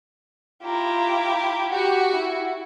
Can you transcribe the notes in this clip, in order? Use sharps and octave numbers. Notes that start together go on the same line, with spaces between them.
E4 F4 G4 A#5
F#4 G4 F#5
E4